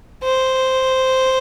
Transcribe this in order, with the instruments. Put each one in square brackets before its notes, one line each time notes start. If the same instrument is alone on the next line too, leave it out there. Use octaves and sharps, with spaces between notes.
[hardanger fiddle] C5